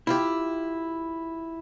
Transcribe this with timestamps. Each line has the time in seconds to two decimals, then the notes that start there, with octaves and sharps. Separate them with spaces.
0.07 E4 F4 G4